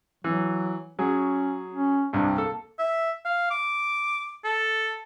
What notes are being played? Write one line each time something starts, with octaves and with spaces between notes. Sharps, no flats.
E3 F#3
F#3 C#4 G#4
C#4
C2 G2 D4
A#3 A4
E5
F5
D6
A4